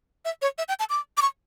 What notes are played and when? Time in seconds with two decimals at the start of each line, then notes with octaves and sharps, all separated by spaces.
0.25 E5
0.42 C#5
0.58 E5
0.69 G5
0.79 A5
0.90 D6
1.17 D6
1.22 C#6